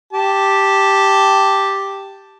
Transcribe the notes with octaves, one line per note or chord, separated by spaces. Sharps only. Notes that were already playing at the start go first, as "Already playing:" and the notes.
G4 A5